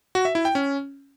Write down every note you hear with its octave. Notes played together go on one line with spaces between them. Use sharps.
F#4
E5
E4
G5
C#4